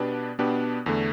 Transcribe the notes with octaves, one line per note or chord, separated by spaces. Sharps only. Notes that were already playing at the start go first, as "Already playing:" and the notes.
Already playing: B2 B3 D4 G4 B4
B2 B3 D4 G4 B4
E2 D3 A3